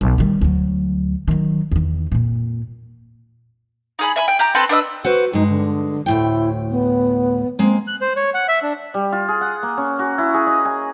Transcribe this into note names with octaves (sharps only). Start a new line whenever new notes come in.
B1
D#3 G3
D2 F#3
D#3 F#3
E2 D#3
F2 A#2
D#4 G#4 B5
E5 G#5 B5
G5
G4 A#5
C4 A4 B4 G5
D4 B4 D#5 E6
F#4 B4 C5 F#5
G2 G#3 D#4
D3
D2 A2 E4 G5
B3
G#3 A#3 C4
F#6
C5
C#5
F#5
E5
D4
G3
F4
G#4
F#5
A#3
C#4
F#4
E4
G#4
D#5
G#5